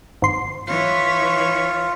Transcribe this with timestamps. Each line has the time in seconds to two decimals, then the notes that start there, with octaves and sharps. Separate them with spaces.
0.22 G#1 C6
0.67 E3 F4 C#5